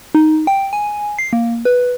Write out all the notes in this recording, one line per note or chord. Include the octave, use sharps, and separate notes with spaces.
D#4
G5
G#5
C7
A#3
B4